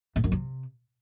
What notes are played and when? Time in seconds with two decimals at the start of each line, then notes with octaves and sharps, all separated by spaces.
0.16 G#2
0.24 F#2
0.32 C3